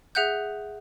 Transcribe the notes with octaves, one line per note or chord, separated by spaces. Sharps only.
G#4 E5 F#5 F#6 G6